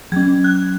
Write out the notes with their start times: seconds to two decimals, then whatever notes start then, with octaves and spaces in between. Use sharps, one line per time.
0.12 F#3 C#4 G#6
0.44 F#6